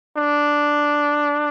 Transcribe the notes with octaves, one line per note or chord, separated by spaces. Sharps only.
D4